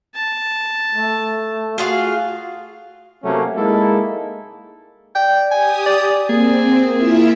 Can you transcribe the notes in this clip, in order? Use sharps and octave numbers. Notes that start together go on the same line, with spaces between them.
A5
A3
F4 F#4 G#4 F5
C3 F#3 A3 A#3 C#4
G#3 A#3 D#4 E4 A4
D5 G5
G4 G#5 D#6
D5
A#3 C4 G#4
E4 F4 E5